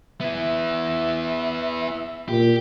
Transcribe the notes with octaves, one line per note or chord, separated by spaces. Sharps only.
B3 E4 E5
A#2 G4